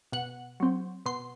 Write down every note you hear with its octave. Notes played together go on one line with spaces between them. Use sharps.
B2 F#5
F#3 C4
B2 C6